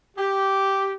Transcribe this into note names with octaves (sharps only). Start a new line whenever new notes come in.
G4